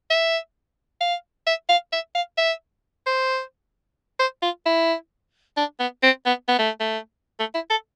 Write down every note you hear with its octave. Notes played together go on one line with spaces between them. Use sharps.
E5
F5
E5
F5
E5
F5
E5
C5
C5
F4
E4
D4
B3
C4
B3
B3
A3
A3
A3
E4
A4